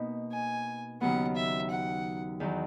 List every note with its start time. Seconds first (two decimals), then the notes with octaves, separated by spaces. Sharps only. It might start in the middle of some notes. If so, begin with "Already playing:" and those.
Already playing: B2 A#3 D#4
0.32 G#5
1.01 D#2 C#3 F#3 B3 F#5
1.36 E5
1.71 F#5
2.40 E2 D#3 F#3